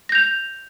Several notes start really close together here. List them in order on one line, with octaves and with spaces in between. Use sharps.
A#6 G6 F7